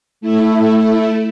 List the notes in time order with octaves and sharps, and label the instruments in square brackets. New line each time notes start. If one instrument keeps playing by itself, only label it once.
[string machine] A3 E4